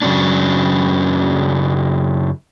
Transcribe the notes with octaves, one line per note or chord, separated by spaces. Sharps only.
F#2 C#3 E3 F#3 C#4 D4